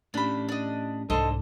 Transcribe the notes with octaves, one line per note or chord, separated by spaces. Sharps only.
A2 C#4 D4 G4 B5
D4 D#5
C2 G#2 D4 A4 C5 D#5 C6